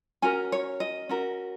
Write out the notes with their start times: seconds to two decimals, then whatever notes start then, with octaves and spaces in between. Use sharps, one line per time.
0.22 C#4 F#4 A#4 G#5
0.52 C#5
0.80 D#5
1.09 C#4 F#4 A#4